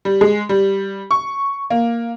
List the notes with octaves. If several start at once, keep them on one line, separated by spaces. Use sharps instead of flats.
G3
G#3
G3
C#6
A#3